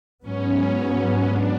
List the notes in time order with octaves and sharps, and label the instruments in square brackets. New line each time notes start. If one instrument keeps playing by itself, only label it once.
[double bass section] G#2 F#3 B3 [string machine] C#4
[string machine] D4